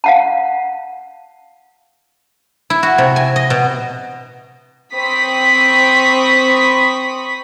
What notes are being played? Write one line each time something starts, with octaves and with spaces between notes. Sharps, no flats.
F5 F#5 A5
E4
F#4
C3
G#5
D#5
B2
C4 B5 C#6 D#6 B6